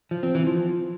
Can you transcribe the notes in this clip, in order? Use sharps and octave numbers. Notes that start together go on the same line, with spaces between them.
F3
C4
E3
F3